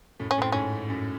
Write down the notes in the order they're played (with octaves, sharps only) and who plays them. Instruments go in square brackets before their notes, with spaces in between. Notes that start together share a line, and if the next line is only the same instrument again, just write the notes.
[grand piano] F#2 A2
[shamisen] C#4
[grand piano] F#2 A2
[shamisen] C4
[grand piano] G#2 [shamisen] C#4
[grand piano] F#2